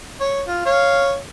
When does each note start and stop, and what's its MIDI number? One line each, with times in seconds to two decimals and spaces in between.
0.21 0.42 73
0.48 0.63 65
0.66 1.16 73
0.66 1.16 77